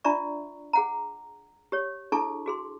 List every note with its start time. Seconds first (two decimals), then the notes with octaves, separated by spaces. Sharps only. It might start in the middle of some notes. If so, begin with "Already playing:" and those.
0.04 D4 F4 D5 E5 A#5 C#6
0.73 G#4 F#5 A#5
1.72 G4 C#5
2.12 D4 E4 G#4 A4 A5 C#6
2.46 F#4 G#4 C6